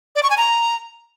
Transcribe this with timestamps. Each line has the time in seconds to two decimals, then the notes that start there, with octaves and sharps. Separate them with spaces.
0.16 D5
0.23 C#6
0.30 G#5
0.38 A#5